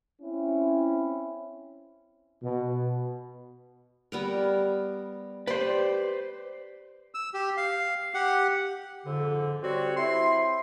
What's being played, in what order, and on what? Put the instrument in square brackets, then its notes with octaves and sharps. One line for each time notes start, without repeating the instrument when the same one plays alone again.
[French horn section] C4 C#4 E4
[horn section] B2
[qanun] G3 B3 A#4
[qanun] G4 D5 [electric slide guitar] B4 C5
[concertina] E6
G4
F5
G4 F#5
[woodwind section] F2 G#2 D3
G3 C4 F#4 C#5
C4 E4 C6